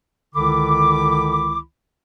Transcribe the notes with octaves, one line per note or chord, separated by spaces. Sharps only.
C#2 D3 D#3 E4 B5 D6